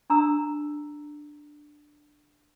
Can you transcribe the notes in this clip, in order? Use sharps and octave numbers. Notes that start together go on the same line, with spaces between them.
D4 A#5 E6